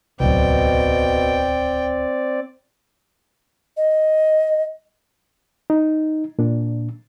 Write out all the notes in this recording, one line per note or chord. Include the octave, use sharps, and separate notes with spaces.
D1 C2 B2 C4 D5 G5
D#5
D#4
A#2 D4